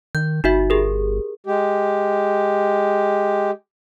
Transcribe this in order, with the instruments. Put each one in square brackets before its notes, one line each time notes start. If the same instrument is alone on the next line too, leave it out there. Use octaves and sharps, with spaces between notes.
[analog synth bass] D#3 [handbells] G6
[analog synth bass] G1 [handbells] D#4 F#4 E5
[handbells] G4 G#4 A#4
[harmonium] G#3 G4